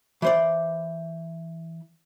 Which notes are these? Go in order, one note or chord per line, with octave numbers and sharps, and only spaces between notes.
E3 C5 D5